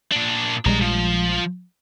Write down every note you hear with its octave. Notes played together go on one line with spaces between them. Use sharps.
A#2 D4
A#1 G3 G#3 G#4 A#5
F3